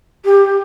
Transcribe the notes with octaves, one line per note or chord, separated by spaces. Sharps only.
G4